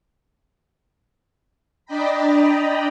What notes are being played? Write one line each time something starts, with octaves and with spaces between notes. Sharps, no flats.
D4 D5 D#5 G5 A#5 B5